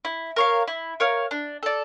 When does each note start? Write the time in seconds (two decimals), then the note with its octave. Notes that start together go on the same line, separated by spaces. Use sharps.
0.05 E4
0.36 A#4 C#5 F5
0.68 E4
1.00 A#4 C#5 F5
1.31 D4
1.63 A4 D5